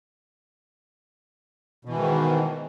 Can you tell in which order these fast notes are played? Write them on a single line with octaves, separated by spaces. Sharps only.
B2 E3 G#2 D#3